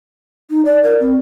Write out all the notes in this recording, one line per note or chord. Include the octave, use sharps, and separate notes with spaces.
D#4
D5
A#4
C4